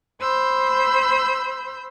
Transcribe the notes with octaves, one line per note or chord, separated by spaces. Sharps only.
C5 B5 E6 G6